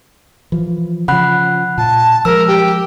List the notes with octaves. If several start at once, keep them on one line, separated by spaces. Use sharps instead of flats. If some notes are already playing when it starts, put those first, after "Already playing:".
E3 F3
C#3 F3 F#5 B5 F#6
A#2 A5
F3 F#3 G#3 A#4 E6
G4